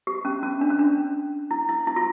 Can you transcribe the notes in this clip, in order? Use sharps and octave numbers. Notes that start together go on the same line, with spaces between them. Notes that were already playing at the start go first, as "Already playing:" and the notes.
G4
C#4
C#4
D4
C#4
D4
E4
E4
E4
F4